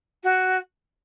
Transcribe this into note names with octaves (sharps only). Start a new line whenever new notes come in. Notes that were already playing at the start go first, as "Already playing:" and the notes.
F#4